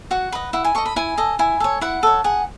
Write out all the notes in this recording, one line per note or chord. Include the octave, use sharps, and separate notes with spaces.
F#4 F#5
B4 D#5
E4 F#5
G#5
A4 D#5 C#6
B5
E4 G#5
A4 D#5
E4 G#5
A4 C#5
E4 F#5
A4 C#5
G#4 F#5